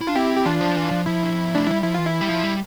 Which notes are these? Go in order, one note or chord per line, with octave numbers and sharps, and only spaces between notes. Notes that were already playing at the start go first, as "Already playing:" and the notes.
E4
D4 F4
C4 E4 G4
G4
E3 D4 F4
F3
E3
F3
F3 E4
D4
C4
B3
A3 D4
G3 E4
F3 E4
E3 F4
E4
G3
F3
G3